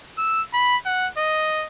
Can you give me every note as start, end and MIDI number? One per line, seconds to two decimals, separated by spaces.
0.18 0.42 88
0.54 0.77 83
0.86 1.08 78
1.18 1.66 75